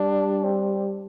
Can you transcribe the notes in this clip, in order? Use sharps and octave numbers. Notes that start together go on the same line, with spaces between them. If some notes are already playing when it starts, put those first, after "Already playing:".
Already playing: G3 D4
C4